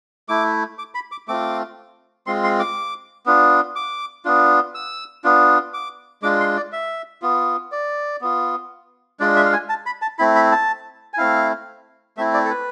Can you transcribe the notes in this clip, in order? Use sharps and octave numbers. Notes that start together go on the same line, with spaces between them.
A3 E4 D6
D6
B5
D6
A3 C4 F4 D6
G#3 C4 F4 C6
C6
D6
B3 D4 F4
D6
B3 D4 F4
E6
B3 D4 F4
D6
G#3 D4 F4 D6
C6
D5
E5
B3 F4
D5
B3 F4
G#3 D4 F4 D5
E5
F5
G#5
A5
B5
A5
A3 C4 E4 B5
B5
A5
G#5
A3 C4 E4 F5
A3 C4 E4 E5
D5
A4
B4